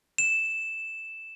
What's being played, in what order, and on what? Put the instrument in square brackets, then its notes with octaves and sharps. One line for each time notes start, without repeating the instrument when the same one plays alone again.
[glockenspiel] E7